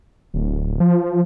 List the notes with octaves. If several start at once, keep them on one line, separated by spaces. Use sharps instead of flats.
D1
F3